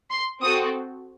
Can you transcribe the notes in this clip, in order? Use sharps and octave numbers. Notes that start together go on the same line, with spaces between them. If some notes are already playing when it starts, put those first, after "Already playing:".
C6
C4 F#4 A4 D#6